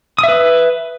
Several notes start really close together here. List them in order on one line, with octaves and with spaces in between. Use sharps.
D#6 E5 B4